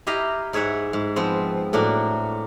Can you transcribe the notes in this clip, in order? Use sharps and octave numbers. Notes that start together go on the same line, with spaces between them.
E4 G4 D#5 F5 A#5
G#2 G#4 C#5 E5 F#5
G#2
F3 B3 C4
A2 A#3 D4 F#4